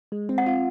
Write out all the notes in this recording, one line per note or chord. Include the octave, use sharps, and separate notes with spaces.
G#3
C4
F#5
F4